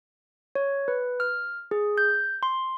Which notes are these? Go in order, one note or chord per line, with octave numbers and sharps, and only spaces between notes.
C#5
B4
F6
G#4
G6
C6